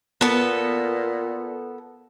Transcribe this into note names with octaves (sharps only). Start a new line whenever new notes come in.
A#2 B3 A4